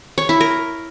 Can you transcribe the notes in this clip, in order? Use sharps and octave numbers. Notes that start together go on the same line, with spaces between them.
C#5
E4
A#4